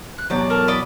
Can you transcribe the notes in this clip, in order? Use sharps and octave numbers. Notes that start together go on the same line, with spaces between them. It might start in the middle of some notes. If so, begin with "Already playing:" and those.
F#6
E2 B2 F#3 G4 D5
A4 A#4 D5
D5 D#5 B5